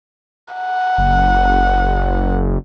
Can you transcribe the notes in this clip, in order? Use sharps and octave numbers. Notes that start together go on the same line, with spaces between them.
F#5
F#1